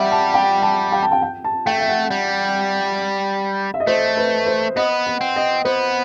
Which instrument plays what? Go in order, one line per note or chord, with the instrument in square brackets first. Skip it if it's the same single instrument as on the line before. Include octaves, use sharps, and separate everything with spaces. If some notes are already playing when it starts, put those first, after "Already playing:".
Already playing: [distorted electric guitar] G3 [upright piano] E5 F#5
[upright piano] A5
G5
A5
G5
A5
G5
G5
A5
[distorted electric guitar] A3 [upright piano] G5
[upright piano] E5
F#5
[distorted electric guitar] G3
[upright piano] E5
D#5
[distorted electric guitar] A3 [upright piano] C5
[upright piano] B4
C5
[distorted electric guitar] B3 [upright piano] D#5
[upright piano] F#5
[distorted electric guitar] C4
[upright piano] D#5
[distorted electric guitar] B3 [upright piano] C5